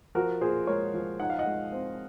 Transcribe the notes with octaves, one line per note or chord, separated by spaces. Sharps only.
F3 F#4 A#4
A#2 G#4 C5
G#3 A#4 C#5
F3
D#4 F#5
F5
D#5 F#5
G#3
C4